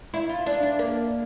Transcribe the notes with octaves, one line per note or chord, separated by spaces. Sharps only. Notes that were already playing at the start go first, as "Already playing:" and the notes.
E4
F4
D4
D4
A#3